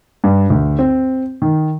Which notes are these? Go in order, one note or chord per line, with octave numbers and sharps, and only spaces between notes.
G2
D2
C4
D#3